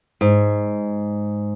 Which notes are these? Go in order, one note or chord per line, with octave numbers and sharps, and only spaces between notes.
G#2